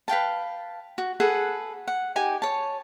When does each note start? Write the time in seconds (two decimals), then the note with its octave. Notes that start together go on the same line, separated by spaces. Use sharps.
0.08 B4 F5 G5 A5
0.98 F#4
1.20 G#4 A4 B4 F#5
1.88 F#5
2.16 D#4 G4 G#5
2.42 C#5 A5